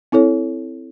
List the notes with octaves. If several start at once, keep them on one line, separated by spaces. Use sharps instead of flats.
C4 E4 A4 C#5